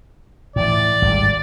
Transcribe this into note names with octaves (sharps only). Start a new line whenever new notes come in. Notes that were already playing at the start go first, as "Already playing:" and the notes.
A2 E3 D5
G#1 G3